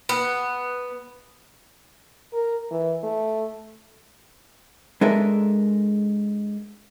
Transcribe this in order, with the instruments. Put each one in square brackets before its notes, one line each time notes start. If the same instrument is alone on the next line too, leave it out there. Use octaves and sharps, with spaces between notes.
[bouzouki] B3
[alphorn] A#4
E3
A3
[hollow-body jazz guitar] G#3 D4 A4 A#4 E5